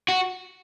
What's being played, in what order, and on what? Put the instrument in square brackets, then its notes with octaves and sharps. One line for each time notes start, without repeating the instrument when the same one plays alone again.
[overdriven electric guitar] F#4